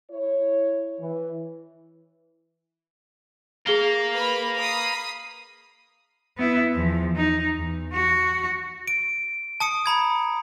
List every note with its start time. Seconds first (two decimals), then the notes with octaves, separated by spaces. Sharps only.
0.11 E4 C#5
0.99 E3
3.67 G#4 A#4 F5 G7
4.14 B4 B5
4.58 B5 D#6 C7
6.38 B3 E4
6.73 E2 F3
7.16 D#4
7.55 E2
7.93 F#4
8.87 D7
9.60 A5 D#6 C#7
9.86 A#5 B5 G#6